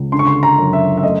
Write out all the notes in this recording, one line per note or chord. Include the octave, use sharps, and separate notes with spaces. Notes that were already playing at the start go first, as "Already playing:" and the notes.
Already playing: C#2
D3 C6
C#6
C6
A#5
F#2
E5
E5
A3 D#5